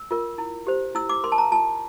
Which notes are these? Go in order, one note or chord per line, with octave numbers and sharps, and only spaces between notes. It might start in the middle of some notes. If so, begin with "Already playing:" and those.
Already playing: E6
F4 A#4
E4
G4 C5
E4 E6
D6
A#4 C6
A5
A#5
F4 A5